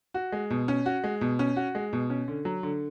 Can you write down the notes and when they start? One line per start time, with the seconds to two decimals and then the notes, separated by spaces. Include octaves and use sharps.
0.14 F#4
0.32 G#3
0.50 B2
0.68 C#4
0.86 F#4
1.04 G#3
1.21 B2
1.39 C#4
1.56 F#4
1.75 G#3
1.93 B2
2.10 C#4
2.28 D3
2.45 F#3
2.63 D3